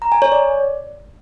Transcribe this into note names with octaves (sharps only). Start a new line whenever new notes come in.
A#5
G#5
C#5
D5